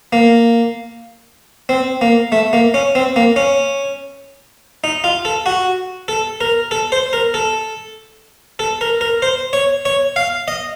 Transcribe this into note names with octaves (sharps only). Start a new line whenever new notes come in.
A#3
C4
A#3
A3
A#3
C#4
C4
A#3
C#4
D#4
F4
A4
F#4
A4
A#4
A4
C5
A#4
A4
A4
A#4
A#4
C5
C#5
C#5
F5
D#5